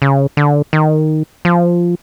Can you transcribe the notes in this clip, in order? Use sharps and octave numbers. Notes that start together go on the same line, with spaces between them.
C#3
D3
D#3
F3